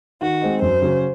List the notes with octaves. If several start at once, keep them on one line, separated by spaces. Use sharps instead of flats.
D#3 F#4
G#3 C4 D#4
F#2 C5
C#3 F#3 C#4